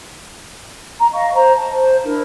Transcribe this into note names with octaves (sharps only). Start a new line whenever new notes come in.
A#5
D#5 F5 C#6
C5 A#5
A5
C5
D4 E4 A#4